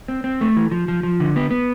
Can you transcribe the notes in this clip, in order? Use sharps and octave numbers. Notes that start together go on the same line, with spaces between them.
C4
C4
A3
E3
F3
F3
F3
D3
B3
B3